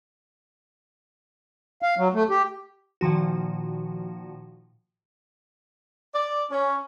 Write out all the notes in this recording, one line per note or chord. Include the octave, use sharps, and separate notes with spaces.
F5
F#3
A3
G4
A#2 D#3 F3 F#4
D5
C#4